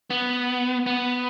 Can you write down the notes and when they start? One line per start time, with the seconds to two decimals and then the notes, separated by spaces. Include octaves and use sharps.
0.10 B3
0.86 B3